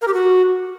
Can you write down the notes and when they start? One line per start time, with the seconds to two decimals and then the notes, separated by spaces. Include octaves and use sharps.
0.02 A#4
0.08 G4
0.14 F#4